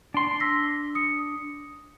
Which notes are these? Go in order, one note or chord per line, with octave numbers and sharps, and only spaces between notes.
D4 C6
E6 A#6 B6
D#6 C#7